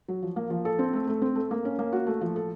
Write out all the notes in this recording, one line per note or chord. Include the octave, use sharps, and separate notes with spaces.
F#3
F3
A#3
F3
A4
C4
A3
A3
C4
A3
A#3
C#4
A#3
F#4
A3
F3
A4